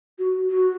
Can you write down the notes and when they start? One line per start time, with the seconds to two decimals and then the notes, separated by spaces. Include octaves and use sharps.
0.18 F#4
0.49 F#4